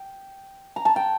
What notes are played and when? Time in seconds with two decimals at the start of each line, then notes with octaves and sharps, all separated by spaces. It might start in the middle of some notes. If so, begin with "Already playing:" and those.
Already playing: G5
0.76 A#5
0.85 A5
0.96 G5